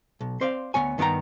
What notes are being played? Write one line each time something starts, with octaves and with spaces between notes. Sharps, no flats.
B1
C4 C5 D5 F5
D2 C3 B3 C#5 G#5
G2 D#3 B3 G4 G5 A#5